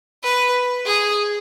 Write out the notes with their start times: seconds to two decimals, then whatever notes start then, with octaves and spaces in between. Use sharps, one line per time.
0.23 B4
0.86 G#4